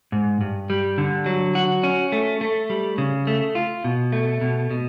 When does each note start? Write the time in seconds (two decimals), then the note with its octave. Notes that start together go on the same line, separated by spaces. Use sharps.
0.12 G#2
0.41 G2
0.70 G3
0.98 D3
1.26 F#3
1.55 F#4
1.83 C#4
2.12 A3
2.41 A3
2.70 G3
2.98 C#3
3.27 A3
3.55 F4
3.84 B2
4.12 A3
4.41 B2
4.71 B2